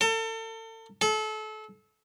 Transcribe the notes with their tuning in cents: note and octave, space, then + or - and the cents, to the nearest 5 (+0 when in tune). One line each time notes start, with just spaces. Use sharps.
A4 +35
A4 -30